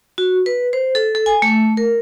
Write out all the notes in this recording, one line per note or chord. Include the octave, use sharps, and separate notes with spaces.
F#4
B4
C5
A4
A4
G#5
A3
A#4